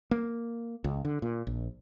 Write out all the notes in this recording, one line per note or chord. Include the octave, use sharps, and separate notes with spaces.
A#3
C#2
D3
A#2
A#1